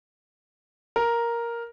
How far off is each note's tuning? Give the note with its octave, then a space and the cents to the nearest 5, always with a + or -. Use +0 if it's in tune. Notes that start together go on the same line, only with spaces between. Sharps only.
A#4 +5